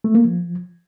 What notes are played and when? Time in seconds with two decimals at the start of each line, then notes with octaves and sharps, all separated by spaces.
0.04 A3
0.15 A#3
0.25 F3